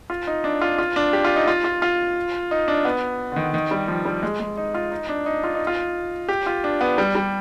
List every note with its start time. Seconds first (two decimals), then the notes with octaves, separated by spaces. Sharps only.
0.10 F4
0.27 D#4
0.44 D4
0.62 F4
0.78 F4
0.96 D4
1.13 G4
1.25 F4
1.36 D#4
1.47 F4
1.64 F4
1.82 F4
2.51 D#4
2.68 D4
2.85 B3
3.32 D3
3.36 D#3
3.54 D#3
3.71 G3
3.88 F3
4.05 G3
4.23 G#3
4.40 G#3
4.57 D#4
4.74 F4
4.91 D#4
5.09 D4
5.26 D#4
5.44 F4
5.55 D#4
5.67 F4
6.29 G4
6.46 F4
6.64 D4
6.81 B3
6.98 G3
7.15 G3